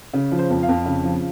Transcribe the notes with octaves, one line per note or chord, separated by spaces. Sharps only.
C#3
F3
C5
F2
F5
F2
C#3
F3